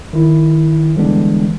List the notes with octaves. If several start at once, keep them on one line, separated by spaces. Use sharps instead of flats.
D#3 E4
D3 E3 G3 G#3 B3 D4